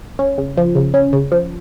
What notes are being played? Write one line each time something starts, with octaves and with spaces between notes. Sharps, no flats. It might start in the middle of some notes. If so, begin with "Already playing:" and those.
C#4
C#3
F3
C#3
C#4
C#3
F3